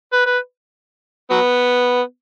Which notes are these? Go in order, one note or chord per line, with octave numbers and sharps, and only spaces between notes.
B4
B4
F#3 B3